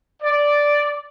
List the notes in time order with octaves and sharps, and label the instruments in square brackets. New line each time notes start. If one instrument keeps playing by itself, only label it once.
[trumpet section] D5